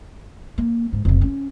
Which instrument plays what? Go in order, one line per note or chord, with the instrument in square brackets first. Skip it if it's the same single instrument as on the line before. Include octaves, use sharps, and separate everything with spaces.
[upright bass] A#3
G#2
F1 C3
C#4